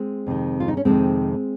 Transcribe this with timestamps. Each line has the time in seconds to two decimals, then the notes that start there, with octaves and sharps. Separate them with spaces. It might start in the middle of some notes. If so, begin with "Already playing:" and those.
Already playing: G#3 C4
0.26 F2 C3 D#3
0.60 F4
0.68 D#4
0.77 C#4
0.85 F2 C3 D#3 G#3 C4